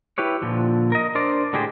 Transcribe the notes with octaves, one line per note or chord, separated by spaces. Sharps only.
E4 G4 B4 C#5
A#2 D3 F3
A#4 D#5
D4 A#4 C5 D5
A2 D3 G#3 G4 G#4 C5